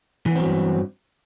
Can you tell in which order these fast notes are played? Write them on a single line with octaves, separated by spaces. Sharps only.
E3 B3 C4 F#3 G2